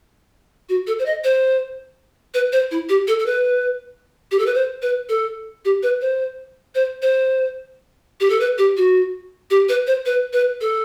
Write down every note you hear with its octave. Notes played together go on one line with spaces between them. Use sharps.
F#4
A4
C5
D#5
C5
B4
C5
E4
G4
A4
A4
B4
G4
A4
B4
C5
B4
A4
G4
B4
C5
C5
C5
G4
A4
B4
G4
F#4
G4
B4
C5
B4
B4
A4